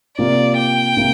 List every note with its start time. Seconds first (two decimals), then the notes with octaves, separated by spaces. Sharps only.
0.18 C3 A#3 F4 D5
0.58 G5
0.97 C3 A#3